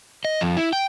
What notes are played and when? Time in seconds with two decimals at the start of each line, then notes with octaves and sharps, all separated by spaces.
0.25 D#5
0.41 F2
0.57 E4
0.73 G5